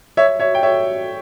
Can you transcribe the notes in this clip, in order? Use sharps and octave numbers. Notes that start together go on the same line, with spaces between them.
C#5 E5
C#5 E5
G5
C#5 E5